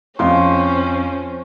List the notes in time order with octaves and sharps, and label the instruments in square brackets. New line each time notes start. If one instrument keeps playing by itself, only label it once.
[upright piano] F2 F4 C6 [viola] C#4 C5